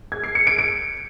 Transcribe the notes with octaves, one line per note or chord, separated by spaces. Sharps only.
G#6
C7
C#7
D7
D7